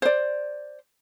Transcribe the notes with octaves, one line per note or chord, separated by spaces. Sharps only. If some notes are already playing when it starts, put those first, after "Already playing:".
C5 D5